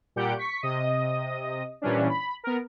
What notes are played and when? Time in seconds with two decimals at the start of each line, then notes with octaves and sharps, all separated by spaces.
0.16 A#2 G3 G4 F#5 G6 D7
0.37 C#6 B6 C#7
0.62 C3 D#5 D#6
1.82 A#2 E3 G3 C#4 D4
2.09 B5
2.44 B3 A#4